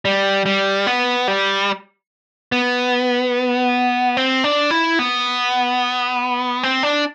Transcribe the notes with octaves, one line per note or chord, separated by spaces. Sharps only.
G3
G3
B3
G3
B3
C4
D4
E4
B3
C4
D4